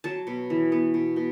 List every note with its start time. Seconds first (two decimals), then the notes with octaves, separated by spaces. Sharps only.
0.04 F#3 A5
0.27 B2
0.50 E3
0.72 B3
0.94 B2
1.16 B2